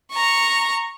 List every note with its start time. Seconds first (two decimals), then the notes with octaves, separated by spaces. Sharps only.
0.12 A#5 C#6